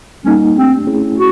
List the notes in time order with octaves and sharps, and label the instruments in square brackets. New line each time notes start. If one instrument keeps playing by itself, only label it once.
[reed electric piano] G3 A#3 D#4 [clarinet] C#4
[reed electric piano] A3 D4 G4 [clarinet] C4
[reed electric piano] A3 C#4 E4 G#4
[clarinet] F#4